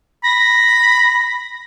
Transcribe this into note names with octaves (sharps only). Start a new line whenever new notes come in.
B5 A#6